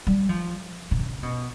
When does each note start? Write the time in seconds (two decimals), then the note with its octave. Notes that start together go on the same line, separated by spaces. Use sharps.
0.07 G3
0.29 F3
0.91 C3
0.99 C#3
1.23 B2